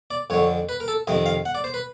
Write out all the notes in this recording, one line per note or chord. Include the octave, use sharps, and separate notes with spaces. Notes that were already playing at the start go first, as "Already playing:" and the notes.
D5
F2 D3 C#5
B4
A#4
A4
F2 C3 D#3 D#5
F5
F#5
D5
C5
B4